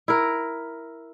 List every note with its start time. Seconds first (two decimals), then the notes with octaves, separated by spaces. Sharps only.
0.08 E4 A#4